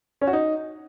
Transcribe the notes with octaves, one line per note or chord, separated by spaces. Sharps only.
C#4
F#4
D#4